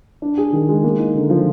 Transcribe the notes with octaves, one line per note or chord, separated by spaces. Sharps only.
D4
G#4
D#3
G#3
A#3
D#4
D3
F3